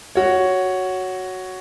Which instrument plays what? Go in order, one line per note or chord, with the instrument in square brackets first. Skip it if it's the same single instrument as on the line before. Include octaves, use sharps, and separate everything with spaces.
[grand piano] F#4 C#5